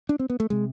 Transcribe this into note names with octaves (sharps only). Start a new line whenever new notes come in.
D4
C4
B3
A3
C3 G#3